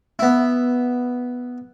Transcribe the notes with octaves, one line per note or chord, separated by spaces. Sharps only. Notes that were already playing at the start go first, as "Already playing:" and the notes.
B3 E4